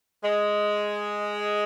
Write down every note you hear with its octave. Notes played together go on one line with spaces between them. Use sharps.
G#3